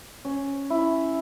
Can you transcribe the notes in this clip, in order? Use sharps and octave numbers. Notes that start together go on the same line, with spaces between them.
C#4
E4